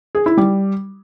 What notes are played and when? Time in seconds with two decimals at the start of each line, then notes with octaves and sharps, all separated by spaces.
0.15 G#4
0.26 E4
0.37 G3